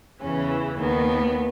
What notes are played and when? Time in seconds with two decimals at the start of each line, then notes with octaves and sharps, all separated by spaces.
0.21 E2 C#3 E3 C#4
0.78 D#2 D#3 B3